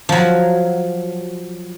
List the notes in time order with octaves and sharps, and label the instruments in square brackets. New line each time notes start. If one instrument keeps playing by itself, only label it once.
[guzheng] F3 F#3